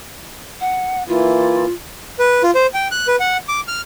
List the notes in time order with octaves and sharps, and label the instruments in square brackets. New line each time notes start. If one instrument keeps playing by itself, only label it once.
[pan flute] F#5
[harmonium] E3 A#3 E4 [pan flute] F4
[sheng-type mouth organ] B4
F4
C5
G5
F#6
B4
F#5
D6
F6